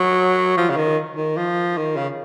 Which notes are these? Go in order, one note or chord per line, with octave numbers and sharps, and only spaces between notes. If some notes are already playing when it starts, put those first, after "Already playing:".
Already playing: F#3
F3
C#3
D#3
D#3
F3
D#3
C#3